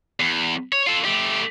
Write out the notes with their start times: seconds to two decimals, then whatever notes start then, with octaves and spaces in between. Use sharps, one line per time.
0.20 E2
0.72 C#5
0.87 F4 A4
1.05 A3 G4